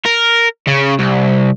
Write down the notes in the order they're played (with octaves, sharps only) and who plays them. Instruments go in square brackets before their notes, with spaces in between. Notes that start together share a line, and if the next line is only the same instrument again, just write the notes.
[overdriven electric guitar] A#4
C#3
C2